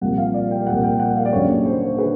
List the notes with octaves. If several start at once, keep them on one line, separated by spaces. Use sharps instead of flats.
C2 A#2 F3 F#5
F5
D5
G5
C2 A#2 F3 F#5
G5
F#5
F5
D5
F#1 F#2 D3 C#5
C5
D3 B4